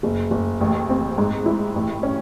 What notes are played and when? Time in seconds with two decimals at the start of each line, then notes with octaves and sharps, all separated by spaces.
0.03 F#1
0.31 F#1
0.61 A1
0.89 C4
1.18 G#2
1.46 E4
1.76 A1
2.03 C#4